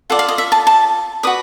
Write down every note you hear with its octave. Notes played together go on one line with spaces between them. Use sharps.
F4 A4 D5 F#5
F5
D#5
E5
A5
A5
F#4 B4 D5 D#6